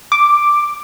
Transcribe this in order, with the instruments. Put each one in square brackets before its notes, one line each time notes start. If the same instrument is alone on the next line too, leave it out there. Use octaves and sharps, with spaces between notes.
[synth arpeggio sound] D6